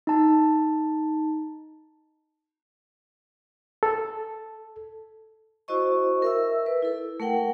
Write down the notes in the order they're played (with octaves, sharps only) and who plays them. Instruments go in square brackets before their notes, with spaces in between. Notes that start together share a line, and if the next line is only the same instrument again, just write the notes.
[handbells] D#4 A5
[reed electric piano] A4
[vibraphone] E4 F#4 C5 D#5 C#6
A#4 E5 E6
B4
E4 A4
A3 A#4 F#5 G5